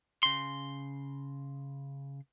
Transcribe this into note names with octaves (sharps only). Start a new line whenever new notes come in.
C#3 C6